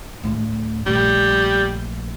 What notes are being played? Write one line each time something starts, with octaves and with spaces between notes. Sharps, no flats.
D2 A2
A#1 G3 A3